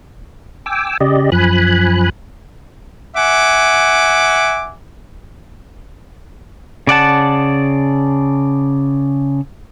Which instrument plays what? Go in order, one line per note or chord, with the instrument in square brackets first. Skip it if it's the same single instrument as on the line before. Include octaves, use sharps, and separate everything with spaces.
[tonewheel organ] G5 G#5 D6 E6
C#3 G4 D5 D#5
F#2 F3 G#5 B5 F#6
[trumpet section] E5 F#5 G#5 D6
[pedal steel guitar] C#3 D5 F#5 A5